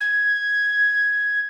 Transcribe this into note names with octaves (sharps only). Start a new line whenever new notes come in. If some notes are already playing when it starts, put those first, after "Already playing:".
G#6